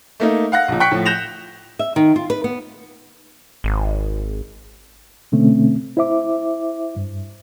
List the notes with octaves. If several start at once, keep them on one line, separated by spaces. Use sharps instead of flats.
A3 A#3 D#4
F5 F#5 F#6 A#6
A#1 A#2
G5 C#6 F#6 B6 C#7
A2 F3
F#6 G6 A#6 E7 F7
E5
D#3
F4
B4
B3
G#1
B2 D3 A3 C4 C#4
E4 C5 E5 D6
G2